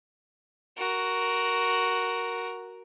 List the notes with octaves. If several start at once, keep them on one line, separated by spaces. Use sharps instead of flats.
F#4 A#4